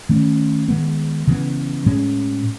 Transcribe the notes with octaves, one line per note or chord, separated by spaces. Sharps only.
D#3 A3 C#4
D#3 G#3 B3
C#3 E3 B3
A2 G#3 C#4